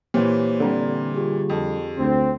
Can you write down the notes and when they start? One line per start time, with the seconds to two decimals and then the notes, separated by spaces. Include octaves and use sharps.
0.14 A#2 E3 G4 C5 C#5
0.60 D3 G3 C4 A#5
1.14 F4 G4 G#4
1.50 F2
1.98 D2 C4